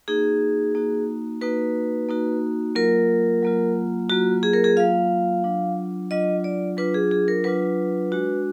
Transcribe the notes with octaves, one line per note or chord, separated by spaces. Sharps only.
A#3 D#4 F#4 G#4
A#3 D#4 F#4
A#3 D#4 F#4 B4
A#3 D#4 F#4
F#3 A#3 F4 A#4
F#3 A#3 F4
F#3 A#3 F4 F#4
G#4
A#4
G#4
F#3 A#3 F4 F5
F#3 D4 F4
F#3 D4 F4 D#5
D5
F#3 D4 F4 B4
G#4
G#4
A#4
F#3 D4 F4 B4
G#3 D4 F#4